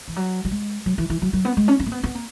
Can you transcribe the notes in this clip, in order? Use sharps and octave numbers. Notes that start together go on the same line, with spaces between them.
E3
F#3
F#3
G#3
F#3
E3
E3
F#3
F#3
B3
G#3
C#4
C#4
A#3
B3
B3
A#3